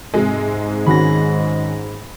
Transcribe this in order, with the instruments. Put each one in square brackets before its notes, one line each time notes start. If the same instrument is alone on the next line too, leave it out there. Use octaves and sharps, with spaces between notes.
[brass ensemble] G#2 [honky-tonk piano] C3 G#3
[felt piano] D#3 C#4 F#4 [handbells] B5 A#6